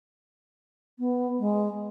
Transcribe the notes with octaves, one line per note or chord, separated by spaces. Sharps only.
B3
G#3